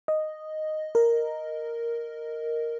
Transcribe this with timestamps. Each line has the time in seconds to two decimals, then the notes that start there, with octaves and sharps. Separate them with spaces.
0.08 D#5
0.95 A#4